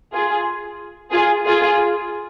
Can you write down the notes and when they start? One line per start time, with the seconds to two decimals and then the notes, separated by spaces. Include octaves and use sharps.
0.13 F4 G#4
1.12 F4 G#4
1.46 F4 G#4